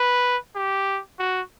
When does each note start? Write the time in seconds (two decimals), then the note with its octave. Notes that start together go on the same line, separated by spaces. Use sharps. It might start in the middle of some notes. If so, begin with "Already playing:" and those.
Already playing: B4
0.55 G4
1.19 F#4